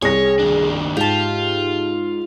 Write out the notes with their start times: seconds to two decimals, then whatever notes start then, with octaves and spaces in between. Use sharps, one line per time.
0.02 C2 G#4 C#5 A#6
0.39 D#2 D4
0.97 G#2 F4 G4 A5